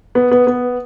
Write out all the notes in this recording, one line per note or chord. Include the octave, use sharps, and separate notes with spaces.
B3
B3
B3